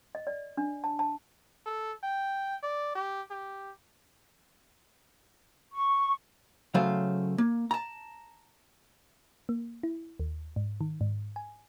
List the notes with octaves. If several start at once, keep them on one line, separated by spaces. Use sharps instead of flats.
D#5
D5
D4
A5
A5
A4
G5
D5
G4
G4
C#6
C#3 F#3 A3 C5 F5
A#3
A5 A#5
A#3
E4
D#2
G#2
D#3
G#2
G#5